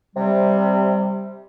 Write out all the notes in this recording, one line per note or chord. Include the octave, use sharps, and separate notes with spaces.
C3 G3